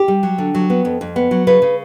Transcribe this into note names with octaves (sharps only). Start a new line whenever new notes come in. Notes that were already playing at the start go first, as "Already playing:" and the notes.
Already playing: G4
G3
F#3
D3
F#3
B3
F2
F2
B3
F#3
C#3 B4
C#3